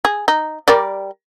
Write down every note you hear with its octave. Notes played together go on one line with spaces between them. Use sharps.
G#4
D#4
G3 A#4 D5